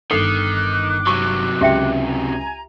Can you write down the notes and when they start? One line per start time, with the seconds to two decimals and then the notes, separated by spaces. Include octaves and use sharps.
0.11 G1 D#3 A4 D6 F#6 C7
1.07 C3 F#3 C#6
1.61 C#2 G4 E5 G5
2.00 G#5 A#5